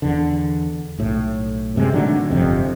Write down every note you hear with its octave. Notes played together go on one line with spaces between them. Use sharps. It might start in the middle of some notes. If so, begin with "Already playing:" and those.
E2 D3
B1 A2
G2 C3 G3 G#3
A2 D3 D#3 F#3
G1 F2 C3